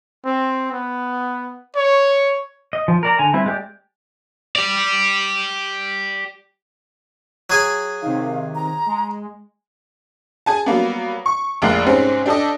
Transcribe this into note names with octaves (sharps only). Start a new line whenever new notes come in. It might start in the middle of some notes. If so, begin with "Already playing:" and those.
C4
B3
C#5
D#5
F3
A#4 D5 A#5
D3 G#5 A#5
G3 C4 E4 B4
G#3 G4 D5
G4 D5
F#3 G#4 G#5
C3 D#3 F5
A#5
G#3
G#4 G#5 A5
F#3 G3 A#3 B3
C#6
F1 A#1 G#3 A#3 F#6 C7
G#2 C3 G#3 C4 C#4
D4 G4 A4 D5 D#5